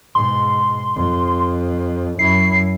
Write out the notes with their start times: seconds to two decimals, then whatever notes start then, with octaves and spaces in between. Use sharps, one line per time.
0.15 G#2 B2 C6
0.95 F2
2.19 F#2 E4 C7